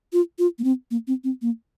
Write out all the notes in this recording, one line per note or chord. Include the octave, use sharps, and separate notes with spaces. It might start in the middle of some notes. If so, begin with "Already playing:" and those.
F4
F4
A#3
C4
A#3
C4
C4
A#3